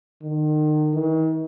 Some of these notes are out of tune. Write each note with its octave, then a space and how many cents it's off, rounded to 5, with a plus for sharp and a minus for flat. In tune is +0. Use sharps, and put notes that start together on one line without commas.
D#3 -35
D#3 +45